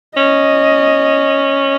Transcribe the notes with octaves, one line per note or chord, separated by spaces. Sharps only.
C#4 D#5